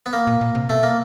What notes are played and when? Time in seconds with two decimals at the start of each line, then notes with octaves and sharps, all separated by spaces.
0.06 B3
0.13 A#3
0.27 A#2
0.41 A#2
0.55 C3
0.70 B2 A3
0.83 A#3